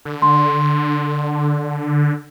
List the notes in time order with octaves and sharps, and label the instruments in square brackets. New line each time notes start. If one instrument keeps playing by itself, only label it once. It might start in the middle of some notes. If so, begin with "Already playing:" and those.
[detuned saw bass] D3
[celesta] C6